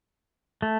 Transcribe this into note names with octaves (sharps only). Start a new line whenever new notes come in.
A3